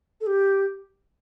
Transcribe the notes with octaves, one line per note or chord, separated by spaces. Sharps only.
A4
G4